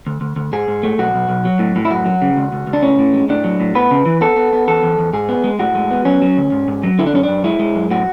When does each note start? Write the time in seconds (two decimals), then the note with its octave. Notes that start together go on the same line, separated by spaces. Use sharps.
0.07 D2
0.21 D2
0.36 D2
0.53 G#2 G#4
0.68 G#2
0.83 A3
0.98 B1 F#4
1.14 B1
1.29 B1
1.45 F#3
1.59 A2
1.76 A2
1.85 E4
1.90 F#2 F#4
2.06 F#3
2.22 C#3
2.37 C#2
2.53 C#2
2.67 C#2
2.73 D4
2.82 A2 C#4
2.99 A2
3.13 G#3
3.29 A2 D4
3.44 F#3
3.60 A2
3.75 B3 B4
3.91 C#3
4.06 E3
4.21 B3 A4
4.36 B3
4.53 B3
4.68 E2 A4
4.83 E2
4.99 E2
5.13 G#2 G#4
5.29 B3
5.44 G#3
5.59 A2 F#4
5.75 G#3
5.91 B3
6.05 F#3 C#4
6.22 F#3
6.37 D2
6.52 G#2
6.68 G#2
6.83 F#3
6.99 D3 E4
7.06 D4
7.13 F#2 C#4
7.23 F#2 D4
7.44 G#3 E4
7.59 G#3
7.76 F#2
7.91 A2 F#4